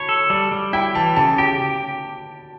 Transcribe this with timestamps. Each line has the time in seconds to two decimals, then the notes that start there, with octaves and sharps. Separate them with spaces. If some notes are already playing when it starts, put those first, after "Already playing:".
Already playing: C#5 A5 B5
0.09 A4
0.30 G3 A5
0.52 G3
0.73 E4 G5
0.95 E3 A5
1.16 C#3 A5
1.38 G4 G5